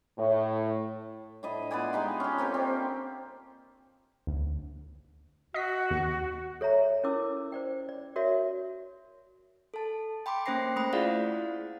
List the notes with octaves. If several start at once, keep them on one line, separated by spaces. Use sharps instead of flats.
A2
A2 D4 D#5 B5
B3 F4 D5 G#5
G#3 D#4 G4
C#4 G4
A#3 C4 G4 A4
C4 D4
D2
F#4 D#5 B6
D#2
A4 C#5 E5 A#5
C#4 E4 F4 A#4 D6 E6
C5 D5 G5
D5
F#4 A#4 C#5 D5 E5
A4 A5
G5 B5 C6 D6
A#3 C#4 C5 G5 A#6 C7
A3 C5 B5
E4 F4 G#4 D5 F5 F#5